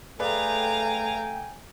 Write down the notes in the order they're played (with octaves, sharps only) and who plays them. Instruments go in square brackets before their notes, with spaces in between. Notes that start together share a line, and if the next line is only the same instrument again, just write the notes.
[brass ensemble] A3 [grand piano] G#4 B4 D5 [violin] F5 A#5 [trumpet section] G5 G#5